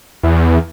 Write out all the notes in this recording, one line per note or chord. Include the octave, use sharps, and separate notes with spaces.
E2